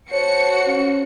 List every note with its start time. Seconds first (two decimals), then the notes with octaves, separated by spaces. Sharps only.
0.11 F#4 C5 C#5 A5 C#7
0.65 C#4